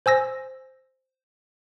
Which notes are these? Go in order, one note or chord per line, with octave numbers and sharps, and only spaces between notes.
C5 G#5 E6 A#6